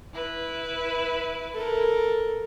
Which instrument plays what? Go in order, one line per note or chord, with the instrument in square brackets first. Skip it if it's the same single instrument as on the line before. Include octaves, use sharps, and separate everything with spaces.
[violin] E4 B4
[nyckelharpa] A4 A#4